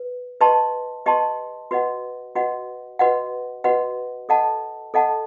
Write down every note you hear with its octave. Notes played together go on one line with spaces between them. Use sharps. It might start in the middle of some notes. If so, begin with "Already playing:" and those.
Already playing: B4
G4 B4 D#5 A5 C6
G4 B4 D#5 A5 C6
F#4 B4 D#5 F#5
F#4 B4 D#5 F#5
F#4 B4 D#5 F#5
F#4 B4 D#5 F#5
A4 D#5 F#5 A5
A4 D#5 F#5 A5